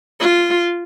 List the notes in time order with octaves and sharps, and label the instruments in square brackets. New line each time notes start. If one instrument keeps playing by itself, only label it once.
[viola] F4